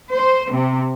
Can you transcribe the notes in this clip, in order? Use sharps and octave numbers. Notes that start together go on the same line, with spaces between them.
C5
C3